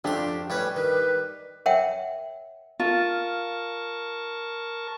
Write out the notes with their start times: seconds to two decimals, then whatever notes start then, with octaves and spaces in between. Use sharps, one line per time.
0.05 F2 A3 D4 G4 C6
0.50 A2 G3 C#4 B4
0.76 D#3 B4
1.66 A#4 C#5 E5 F#5 G5
2.80 F4 A#4 A5 C#6